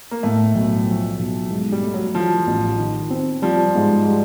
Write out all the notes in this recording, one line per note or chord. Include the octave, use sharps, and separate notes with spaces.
A#3
A2 A3
B1
F3
B1
G#2
G3
A3
F#3
E3 F3
A1
D#3
C4
F3 G3
G#2
G3